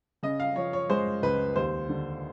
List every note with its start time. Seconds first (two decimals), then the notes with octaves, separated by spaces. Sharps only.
0.23 C#3 D#5
0.40 F5
0.56 F3 C#5
0.73 C#5
0.89 G#3 C5
1.23 C#2 B4
1.56 D#2 C5
1.89 D3